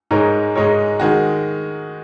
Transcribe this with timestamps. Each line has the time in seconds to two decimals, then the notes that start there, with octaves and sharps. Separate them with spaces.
0.11 G#2 G#3 D#4 A#4 C#5
0.55 G#2 G#3 D#4 A#4 C#5
1.00 D#3 G#3 F#4